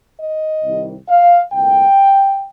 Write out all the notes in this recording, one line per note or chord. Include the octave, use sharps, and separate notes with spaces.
D#5
C2 C3 D#3 G3
F5
C2 A#2 A3 G5